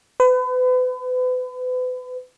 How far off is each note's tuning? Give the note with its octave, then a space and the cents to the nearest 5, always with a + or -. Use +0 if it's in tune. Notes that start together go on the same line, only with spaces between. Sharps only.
B4 +35